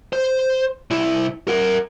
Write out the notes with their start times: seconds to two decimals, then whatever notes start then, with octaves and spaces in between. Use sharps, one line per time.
0.13 C5
0.91 C2 E4
1.48 A#4 F#5